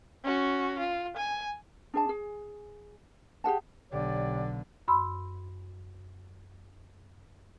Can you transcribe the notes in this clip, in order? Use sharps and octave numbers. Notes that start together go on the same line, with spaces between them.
C#4 F#4
F4
G#5
D4 G#4 A5
G#4
G4 G#4 F#5 A5
B1 D3 G4 C#5 D5
F#2 B5 C6 E6